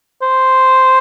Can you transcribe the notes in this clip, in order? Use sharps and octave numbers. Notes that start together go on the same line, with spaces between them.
C5